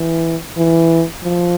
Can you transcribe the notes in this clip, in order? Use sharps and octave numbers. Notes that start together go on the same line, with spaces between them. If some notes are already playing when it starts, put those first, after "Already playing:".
Already playing: E3
E3
F3